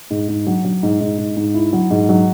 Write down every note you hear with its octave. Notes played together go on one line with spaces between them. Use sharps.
G#2
G#2
F#3
F#3
G#2
G#2
G#2
G#2
E4
F#3
G#2
F#3